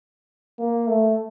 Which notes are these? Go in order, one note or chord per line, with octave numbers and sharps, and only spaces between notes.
A#3
A3